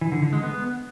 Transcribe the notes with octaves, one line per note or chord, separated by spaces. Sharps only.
E3
D3
D3
G#3
B3